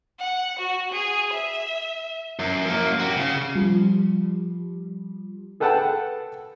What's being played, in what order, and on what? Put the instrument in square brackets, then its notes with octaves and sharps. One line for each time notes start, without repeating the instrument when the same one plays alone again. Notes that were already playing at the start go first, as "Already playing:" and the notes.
[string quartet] F#5
F#4
G#4
E5
[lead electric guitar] F#2
F#2 A#3
F#4 G4
C#3
[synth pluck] F3 G3
[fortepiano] G#4 A4 B4 F#5 G5 A5